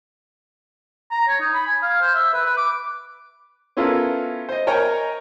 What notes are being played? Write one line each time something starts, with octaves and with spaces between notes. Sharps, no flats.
A#5
C#5
D#4
B5
G#5
F5
C5
E5
B4
B4
D6
B3 C#4 E4 F4 A4 A#4
C5 D#5
A#4 C#5 D#5 G5 G#5 A#5